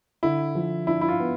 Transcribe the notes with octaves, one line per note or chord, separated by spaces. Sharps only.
D3 E4
F3
D4 E4
E4
F4
B3